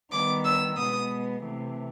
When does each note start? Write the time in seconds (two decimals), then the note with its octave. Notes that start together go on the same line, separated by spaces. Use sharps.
0.12 D#3 G3 B3 D6
0.45 E6
0.77 B2 G#3 B3 D#6
1.42 C3 E3 A3